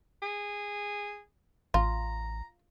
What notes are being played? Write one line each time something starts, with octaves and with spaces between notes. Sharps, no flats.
G#4
A1 F4 A#5